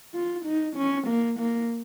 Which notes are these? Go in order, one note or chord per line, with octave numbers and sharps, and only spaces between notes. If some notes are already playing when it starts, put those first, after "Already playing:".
F4
D#4
C#4
A#3
A#3